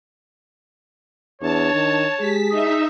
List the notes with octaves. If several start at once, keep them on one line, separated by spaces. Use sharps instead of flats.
E2 D4 C#5 A5
D#3
G#3 G4 G#4 B6
D#4 E5 D#6